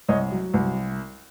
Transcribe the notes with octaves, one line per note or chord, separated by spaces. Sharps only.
C2 C#5 D#5
F#3
C2